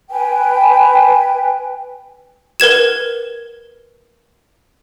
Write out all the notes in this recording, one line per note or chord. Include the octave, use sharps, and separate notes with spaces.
B4 G5 G#5
A#4 B4 G#6 E7